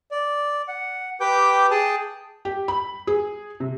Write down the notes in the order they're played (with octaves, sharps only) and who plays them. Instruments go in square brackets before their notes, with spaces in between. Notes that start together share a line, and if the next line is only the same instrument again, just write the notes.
[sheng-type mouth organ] D5
F#5
G4 B4 G5 D6 G6
G#4 G5 A5 D#6
[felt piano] G4
B5
G#4
C3